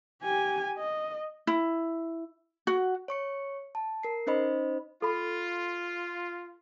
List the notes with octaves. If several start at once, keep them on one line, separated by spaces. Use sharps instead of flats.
G4 G#5
D#5
E4
F#4
C#5 C#6 C#7
A5
A#4 C7
C#4 D#4 C5 D#5 B5
F4 A4 B5